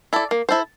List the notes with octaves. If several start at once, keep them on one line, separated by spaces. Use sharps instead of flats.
E4 A4 D5
A#3
E4 A4 C5